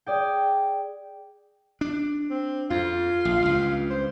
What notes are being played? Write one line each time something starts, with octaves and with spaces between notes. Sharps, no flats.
G#4 D5 G5
D4
C4
F2 F4
A#1
C#2 G2
C5